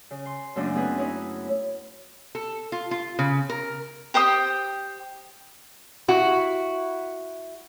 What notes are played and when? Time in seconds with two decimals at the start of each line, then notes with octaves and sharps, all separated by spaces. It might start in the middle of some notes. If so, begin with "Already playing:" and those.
0.11 C#3
0.26 C6
0.56 F#2 C#3 A3 A#3 D4 D#4
0.75 A3 B3 C4 G#4 B4
0.99 D#4 E4 C#5
2.35 A4
2.72 F4
2.91 F4
3.19 C#3
3.50 A#4
4.14 G4 C5 G5 D#6
6.08 E4 F#4